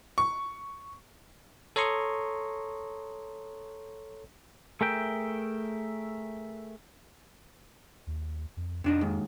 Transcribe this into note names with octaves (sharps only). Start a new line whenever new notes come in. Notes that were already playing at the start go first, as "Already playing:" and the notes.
C#6
A4 C#5 A#5 C6 C#6 D#6
A3 G#4 A#4 E5 G5
D#2
F2
F2 C3 D4 D#4
D#2 G#2 D#3